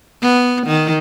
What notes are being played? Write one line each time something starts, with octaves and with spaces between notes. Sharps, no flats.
B3
D#3